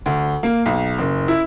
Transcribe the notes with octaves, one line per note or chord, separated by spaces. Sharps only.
D2
A#3
B1
F#1
E4